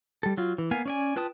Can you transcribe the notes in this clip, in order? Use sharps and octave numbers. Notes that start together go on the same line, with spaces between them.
G3 A4
F#3 F4
E3
A#3 B3 F5 G#5
C#4 D5 G#5
F4 B4 G5 A5 D#6